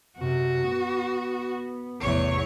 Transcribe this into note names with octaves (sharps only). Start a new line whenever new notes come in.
F#2 C3 F#4
B3
A1 E2 C3 C#5